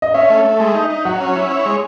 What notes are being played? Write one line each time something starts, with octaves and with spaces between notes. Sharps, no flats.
D#5
C#4 E5
A3
A3
G#3
D#4
D#4
F#3 F#5
C#4
E4
C#5
G#3